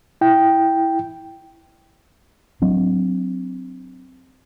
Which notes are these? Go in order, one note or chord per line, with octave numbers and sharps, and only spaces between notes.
E4 G5
F#3 C4 D4